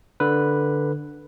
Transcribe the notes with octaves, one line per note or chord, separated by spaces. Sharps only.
D3 B4